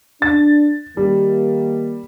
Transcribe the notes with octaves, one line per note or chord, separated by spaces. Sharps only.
D4 A6
D#3 G3 A#3 G4